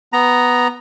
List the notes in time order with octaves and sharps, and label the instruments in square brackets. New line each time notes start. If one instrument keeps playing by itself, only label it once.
[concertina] B3 A#5